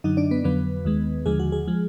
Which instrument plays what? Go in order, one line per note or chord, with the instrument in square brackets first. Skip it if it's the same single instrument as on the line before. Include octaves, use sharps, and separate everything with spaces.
[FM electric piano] F#2 D3 F#3 D#4 D#5
D4 D5
B3 B4
F2 D3 F#3 B3 B4
D#2 D#3 G#3
D#2 D3 F3 G#3 G#4
F#4
G#4
F3 G#3